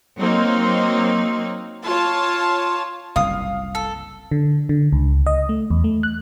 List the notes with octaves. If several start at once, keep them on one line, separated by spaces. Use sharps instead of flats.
F#3 A#3 C4 D#4
F4 C#5 A5
F#1 C2 F5 D#6
A4
D3
D3
C#2
D#5
A3
E2
A3
F#6